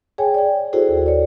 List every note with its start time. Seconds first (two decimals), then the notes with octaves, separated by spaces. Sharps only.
0.18 G#4 C#5 G5 G#5
0.34 D5 G5
0.73 E4 F#4 G#4 A4 C5
0.89 D#2
1.06 C#5 D5